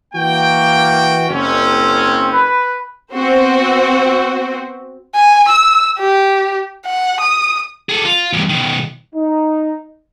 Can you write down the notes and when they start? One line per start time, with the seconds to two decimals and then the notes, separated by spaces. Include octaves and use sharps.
0.14 E3 A#3 F#4 G5
1.30 F#1 C4 C#4
2.33 B4
3.13 B3 C4 F#4 C5
5.15 G#5
5.48 E6
5.99 G4
6.86 F#5
7.20 D#6
7.89 G#4 A4
8.05 F4
8.33 E2 G2
8.49 B2 D#3
9.15 D#4